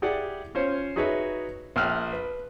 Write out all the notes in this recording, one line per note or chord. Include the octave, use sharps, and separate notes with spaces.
E4 G4 G#4 D5 F#5
C#4 F4 C5 C#5
D#4 F#4 G#4 B4 C#5 E5
A#1 E5 G5 F6 F#6
B4